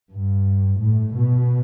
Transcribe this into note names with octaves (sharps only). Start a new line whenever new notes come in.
G2
A2
B2